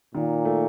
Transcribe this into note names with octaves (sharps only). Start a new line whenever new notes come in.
A#2 D#3
A3